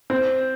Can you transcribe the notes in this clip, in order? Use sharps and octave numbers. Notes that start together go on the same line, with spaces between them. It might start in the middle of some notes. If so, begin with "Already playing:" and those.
C4